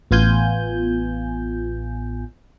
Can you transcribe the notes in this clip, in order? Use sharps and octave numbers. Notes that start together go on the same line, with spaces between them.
A1 B3 F4 G#5 G6